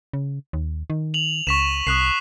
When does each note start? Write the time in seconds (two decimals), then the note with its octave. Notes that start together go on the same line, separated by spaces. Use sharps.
0.13 C#3
0.53 D#2
0.90 D#3
1.14 F7 F#7
1.47 C#2 C#6 B6 E7
1.87 C2 D#6 F#6 C7